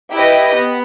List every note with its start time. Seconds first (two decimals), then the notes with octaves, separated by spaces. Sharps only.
0.12 E4 G4 B4 D#5
0.54 B3